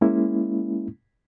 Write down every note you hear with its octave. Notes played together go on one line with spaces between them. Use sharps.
G#3 A#3 C#4 E4